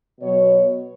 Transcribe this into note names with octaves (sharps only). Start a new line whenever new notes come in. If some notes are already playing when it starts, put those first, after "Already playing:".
B2 F#3 C#5